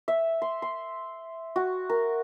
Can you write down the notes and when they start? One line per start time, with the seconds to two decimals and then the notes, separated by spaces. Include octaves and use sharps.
0.08 E5
0.42 C6
0.62 C6
1.56 F#4
1.89 A#4